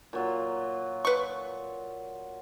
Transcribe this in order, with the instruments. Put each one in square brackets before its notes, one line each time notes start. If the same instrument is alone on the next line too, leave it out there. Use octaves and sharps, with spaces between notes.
[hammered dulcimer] A#2 F#3 F4
[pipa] B4 C#6